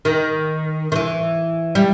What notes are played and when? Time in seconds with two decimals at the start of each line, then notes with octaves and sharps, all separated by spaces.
0.05 D#3
0.92 D#3
0.96 E3
1.75 G3